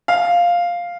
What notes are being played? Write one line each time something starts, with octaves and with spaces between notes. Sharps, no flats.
F5